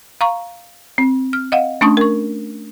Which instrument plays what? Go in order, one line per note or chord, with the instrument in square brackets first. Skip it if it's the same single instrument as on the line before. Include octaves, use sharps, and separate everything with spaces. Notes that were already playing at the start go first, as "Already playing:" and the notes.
[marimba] F5 A#5 C#6
C4
F6
D#5 F5 F#5
A3 C#4 D4 A5 C#6 D#6
A#4 C#6